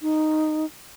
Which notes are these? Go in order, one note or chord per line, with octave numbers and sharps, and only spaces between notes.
D#4